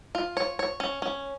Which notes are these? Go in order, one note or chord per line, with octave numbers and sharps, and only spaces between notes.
F4
C#5
C#5
C#4
C#4